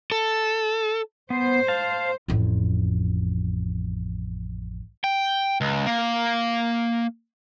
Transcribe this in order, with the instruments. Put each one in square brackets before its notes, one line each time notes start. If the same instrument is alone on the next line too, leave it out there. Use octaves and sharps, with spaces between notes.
[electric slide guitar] A4
[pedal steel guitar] B3 [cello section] C5
[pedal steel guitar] F5 A5
[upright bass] A1 F2
[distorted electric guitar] G5
C#2
A#3